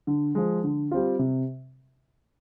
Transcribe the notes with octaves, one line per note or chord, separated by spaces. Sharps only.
D3
F3 G#3
D3
G3 C4 F4
C3